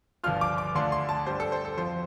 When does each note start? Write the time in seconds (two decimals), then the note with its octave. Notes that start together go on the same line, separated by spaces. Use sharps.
0.24 G1 G2 F3 D4 F4 F6
0.41 D6
0.58 D6
0.75 D2 D3 A3 D4 F4 C6
0.92 C6
1.09 A5
1.26 G2 G3 D4 C5
1.40 A4
1.52 C5
1.65 A4
1.77 F2 F3 C4 F4 C5